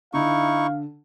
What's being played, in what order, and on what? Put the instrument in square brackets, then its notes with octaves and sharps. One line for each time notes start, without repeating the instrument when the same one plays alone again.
[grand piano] D3 [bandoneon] D#4 E4 C#6 [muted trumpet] F5